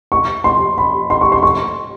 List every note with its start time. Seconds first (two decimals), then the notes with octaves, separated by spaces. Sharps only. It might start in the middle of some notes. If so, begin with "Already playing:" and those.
0.12 C#6
0.44 C6
0.78 B5
1.10 C6
1.21 C#6
1.32 C6
1.43 C#6